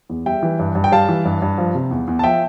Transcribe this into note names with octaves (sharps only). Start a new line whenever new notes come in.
E2
G3 E5 G5
E3
G2
G2
G5
G3 F5 A5
E3
G2
G2
F3
C3
E2
E2
A5
F3 E5 G5